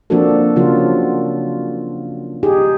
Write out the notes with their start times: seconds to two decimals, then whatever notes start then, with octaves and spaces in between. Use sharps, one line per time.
0.10 F3 A#3 C4 D4 F#4 A4
0.56 C#3 F3 F#3 F4
2.43 D#4 G4 G#4